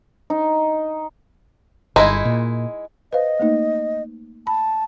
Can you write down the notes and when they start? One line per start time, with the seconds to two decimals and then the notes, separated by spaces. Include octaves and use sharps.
0.30 D#4
1.96 G1 G#3 D#4 E4
2.25 A#2
3.13 B4 C5 D#5 F5
3.39 A3 A#3 D#4
4.47 A5 B5